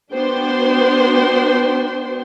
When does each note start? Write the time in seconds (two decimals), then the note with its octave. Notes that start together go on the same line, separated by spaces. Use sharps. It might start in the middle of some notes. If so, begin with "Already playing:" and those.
0.12 B3 D4 F#4 C5 G5 C6